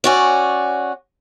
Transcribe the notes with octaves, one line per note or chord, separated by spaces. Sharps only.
C#4 F#4 D5